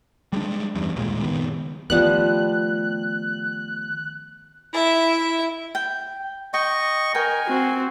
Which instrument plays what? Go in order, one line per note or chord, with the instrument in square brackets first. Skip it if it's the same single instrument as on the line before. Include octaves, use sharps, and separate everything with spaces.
[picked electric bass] G3 G#3 A#3 D4
E2 G2
A#1 D#2 A#2 G#3
F#1 D#3 B3
[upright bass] D#3 A3 [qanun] F3 G3 B3 [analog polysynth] F#6
[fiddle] E4 E5
[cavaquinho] G5
[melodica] D#5 C#6 [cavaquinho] G5
[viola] A#4 [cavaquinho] G5 [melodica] G#5
[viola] C4 F#4